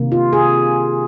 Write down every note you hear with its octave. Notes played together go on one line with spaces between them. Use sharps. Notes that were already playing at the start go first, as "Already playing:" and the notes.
Already playing: C3 D#3 A#3
F4
G#4